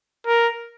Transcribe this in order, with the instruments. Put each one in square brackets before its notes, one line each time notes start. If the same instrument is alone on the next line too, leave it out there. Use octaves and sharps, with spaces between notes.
[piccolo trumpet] A#4